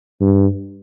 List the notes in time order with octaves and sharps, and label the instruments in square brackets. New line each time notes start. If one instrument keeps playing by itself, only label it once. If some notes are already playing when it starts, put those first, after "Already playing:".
[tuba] G2